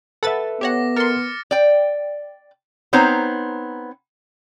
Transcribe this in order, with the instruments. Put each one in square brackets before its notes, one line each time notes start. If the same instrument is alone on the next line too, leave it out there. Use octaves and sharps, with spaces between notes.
[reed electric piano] A4 B4 E5 [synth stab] F#5 B5 A6
[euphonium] B3 [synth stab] G4 C#5 F#5 [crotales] D6 A#6
[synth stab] A#4 C6 [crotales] F6 A6 C#7
[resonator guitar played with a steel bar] D5 G5
B3 C4 D#4 C5 C#5 A#5